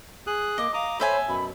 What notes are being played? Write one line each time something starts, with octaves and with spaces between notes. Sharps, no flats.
G#4 D#6 F#6
A#3 D#5 D6
F5 A#5 D6 D#6
A4 C5 C#5 E5 G#5 B5
F#2 B2 B5